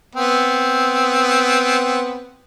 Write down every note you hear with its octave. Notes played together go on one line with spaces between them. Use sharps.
B3 C4